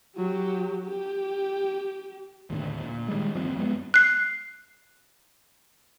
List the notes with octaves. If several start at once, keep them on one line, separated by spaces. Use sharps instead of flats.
F#3 G4
G4
D#2 A2 D3
A#2
D#3 G3 G#3
G1 D#2 F3 C4
F#2 G#3 B3
F#6 C7